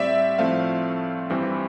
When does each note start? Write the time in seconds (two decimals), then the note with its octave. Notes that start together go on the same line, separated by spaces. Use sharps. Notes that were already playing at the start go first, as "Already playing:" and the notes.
Already playing: A2 G3 C4 D5 E5
0.38 A2 F3 A3 C4 F5
1.30 G2 E3 G3 C4